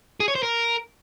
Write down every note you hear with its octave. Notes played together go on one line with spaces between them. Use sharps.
G#4
C#5
C5
A#4